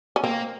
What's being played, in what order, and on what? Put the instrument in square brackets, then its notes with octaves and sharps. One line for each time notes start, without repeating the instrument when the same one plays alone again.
[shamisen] C#4
[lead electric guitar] A#3 [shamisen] C4